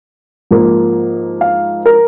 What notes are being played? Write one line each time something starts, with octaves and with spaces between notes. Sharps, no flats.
G#2 F3 A#3
F5
A#4